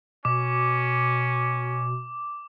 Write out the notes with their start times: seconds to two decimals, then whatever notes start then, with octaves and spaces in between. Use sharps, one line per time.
0.25 B2 C#4 D6